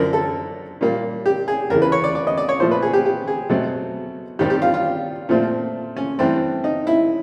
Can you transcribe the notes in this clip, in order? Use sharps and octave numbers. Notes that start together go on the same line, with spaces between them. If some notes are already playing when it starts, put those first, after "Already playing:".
Already playing: F#2 D3 F3 A#4
A4
A#2 G3 A#3
G4
G#4
E2 C#3 E3 A#4
B4
C#5
D5
D5
D#5
D5
C#5
A#2 F3 A3 C5
B4
G#4
G4
G4
G#4
B2 F#3 A3 C4
G2 D#3 G3 C4 G4
G4
F4
F4
A#2 F3 A3 C4
C#4
G2 E3 A3 C4
D#4
E4